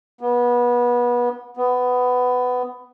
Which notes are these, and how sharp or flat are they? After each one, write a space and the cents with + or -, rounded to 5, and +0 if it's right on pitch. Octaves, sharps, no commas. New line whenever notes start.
B3 -25
B3 +15